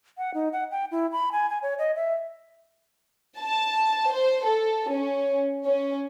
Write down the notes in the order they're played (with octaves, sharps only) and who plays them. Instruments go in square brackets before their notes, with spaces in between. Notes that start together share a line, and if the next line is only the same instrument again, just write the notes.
[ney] F#5
D#4
F#5
G5
E4
B5
G#5
G#5
C#5
D#5
E5
[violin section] A5
C5
A4
C#4
C#4